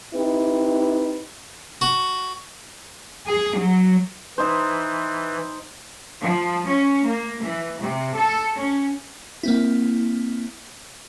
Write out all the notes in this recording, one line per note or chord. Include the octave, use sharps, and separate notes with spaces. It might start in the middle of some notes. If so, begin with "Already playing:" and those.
C4 D#4 E4 G4 B4
F#4
G#4
F#3
E3 D#4 C5
F3
C#4
A#3
E3
C3
A4
C#4
A#3 C4 E4